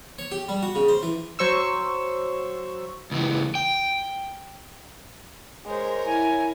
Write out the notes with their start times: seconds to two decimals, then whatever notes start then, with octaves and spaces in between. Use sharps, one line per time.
0.18 C#5
0.32 G4
0.49 G3
0.63 F#4
0.75 C#3
0.88 C5
1.02 E3
1.39 F#3 C5 C#6 E6
3.11 C#2 E3
3.55 G5
5.66 G#3 A#4 C5 C#5
6.06 E4 G#5